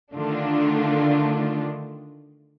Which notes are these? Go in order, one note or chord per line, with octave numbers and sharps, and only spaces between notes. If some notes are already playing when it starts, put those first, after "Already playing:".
D3 D#3 A3 D4 F4